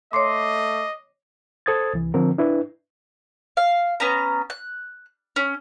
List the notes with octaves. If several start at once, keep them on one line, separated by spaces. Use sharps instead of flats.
A3 C#5 D#5 C6 D6 C7
A4 C5 D#6 G#6 A6
C2 E3
D3 F3 C4 A#4
D4 E4 B4
F5
B3 C#4 A#5
F#6
C#4